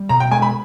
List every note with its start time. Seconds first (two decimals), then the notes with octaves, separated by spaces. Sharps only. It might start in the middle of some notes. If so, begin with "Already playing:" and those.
Already playing: G3
0.09 B2 A#5
0.20 G5
0.31 G#3 G#5
0.42 B5